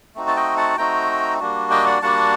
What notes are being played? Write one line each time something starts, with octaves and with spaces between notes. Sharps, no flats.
A3 C4 D#4 F#4
A5
D#5 G5
F#5 A5
A3 C4 D#4 F#4 G5 A#5
G3 A#3 D4 F#4
D#5 G5
D5 F#5
G3 A#3 D4 F#4 F#5 A5